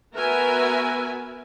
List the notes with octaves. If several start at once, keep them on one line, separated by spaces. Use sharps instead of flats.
B3 F#4 A#4 B4 E5 G#5